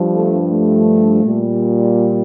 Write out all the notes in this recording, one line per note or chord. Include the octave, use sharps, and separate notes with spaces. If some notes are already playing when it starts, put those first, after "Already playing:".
Already playing: G2 F3
A3
A3
A#2 G3